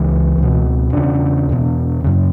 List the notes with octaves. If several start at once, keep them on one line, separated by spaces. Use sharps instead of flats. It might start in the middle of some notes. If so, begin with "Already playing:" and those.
Already playing: C#2 C#3 E3
C#2 B2
E2 C#3 D4
E2 B2
F#2 C#3